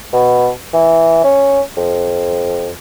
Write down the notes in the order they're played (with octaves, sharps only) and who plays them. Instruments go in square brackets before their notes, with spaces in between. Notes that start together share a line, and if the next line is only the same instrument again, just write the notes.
[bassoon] B2
E3
C#4
F2